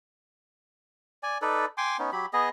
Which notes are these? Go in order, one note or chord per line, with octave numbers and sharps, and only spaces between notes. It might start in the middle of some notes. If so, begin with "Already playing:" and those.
D5 G#5
D#4 A4 B4 D5
G5 G#5 C6 D6
B3 C#4 D#4
F#3 G4 B5
B3 G#4 D#5